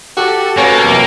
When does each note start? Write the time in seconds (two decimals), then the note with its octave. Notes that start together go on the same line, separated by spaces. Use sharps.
0.17 F#4 G4 A4
0.57 B2 A#3 C#4 F5
0.84 F#2 C3 E3 G5 D6